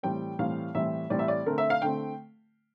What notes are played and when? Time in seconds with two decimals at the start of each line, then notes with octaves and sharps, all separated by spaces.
0.03 A2 E3 G3 C4 G5
0.39 A2 E3 G3 C4 F5
0.75 A2 E3 G3 C4 E5
1.10 A2 E3 G3 C4 D5
1.19 E5
1.28 D5
1.46 D3 A3 C4 A#4
1.58 E5
1.70 F5
1.82 D3 A3 C4 G5